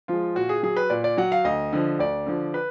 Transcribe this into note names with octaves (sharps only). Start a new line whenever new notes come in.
F3 G#3 F4
A#2 F#4
G#4
F#3 G#4
B4
A#2 D5
D5
F#3 F#5
F5
D2 D#5
D3 F3
D2 D5
D3 F3
B4